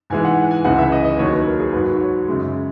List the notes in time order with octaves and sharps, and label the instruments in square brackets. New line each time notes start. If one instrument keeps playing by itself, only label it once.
[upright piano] G#2 E3 G#3 G#5
F#5
G#5
C#2 C#3 E3 G#3 F#5
E5
D#5
D#5
D#2 D#3 F#3 C#5
B4
A#4
G#4
G#2 F#3 B4
C#5
F#2 C#3 G#3